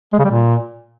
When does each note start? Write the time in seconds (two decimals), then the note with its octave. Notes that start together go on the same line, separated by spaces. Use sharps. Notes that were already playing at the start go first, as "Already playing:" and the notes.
0.13 G#3
0.19 C#3
0.25 G3
0.30 A#2